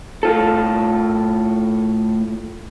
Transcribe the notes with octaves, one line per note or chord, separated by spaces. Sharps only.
A2 F4 A4